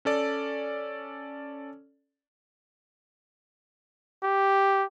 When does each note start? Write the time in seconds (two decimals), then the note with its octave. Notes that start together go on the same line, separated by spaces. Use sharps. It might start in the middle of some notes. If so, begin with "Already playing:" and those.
0.05 C#4 A4 D5
4.23 G4